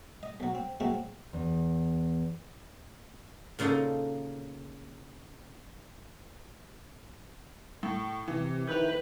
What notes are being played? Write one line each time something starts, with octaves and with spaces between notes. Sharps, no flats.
D#5
B1 F#3
C4
A#2 F#3 G#3 A3 C4
E2
A#2 C#3 A#3 D#4 A4
A2
C3 E3
D#3 F3 E4 B4 G6 F7